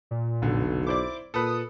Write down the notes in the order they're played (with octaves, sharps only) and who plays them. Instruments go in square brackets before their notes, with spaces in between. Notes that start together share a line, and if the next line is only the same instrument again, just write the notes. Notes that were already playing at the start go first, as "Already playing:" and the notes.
[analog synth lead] A#2
[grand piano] F1 D3 [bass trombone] B1
[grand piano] E4 C5 D5 [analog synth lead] D6
[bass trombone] A#2 [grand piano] A4 B4 [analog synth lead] D#6